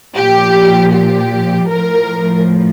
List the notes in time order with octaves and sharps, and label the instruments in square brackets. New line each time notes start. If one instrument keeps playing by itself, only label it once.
[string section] A#2 F3 G4
G4
A2 F3 A#4